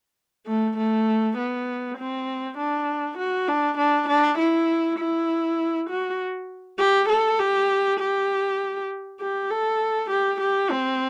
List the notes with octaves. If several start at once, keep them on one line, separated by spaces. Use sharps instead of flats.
A3
A3
B3
C4
D4
F#4
D4
D4
D4
E4
E4
F#4
G4
A4
G4
G4
G4
A4
G4
G4
C4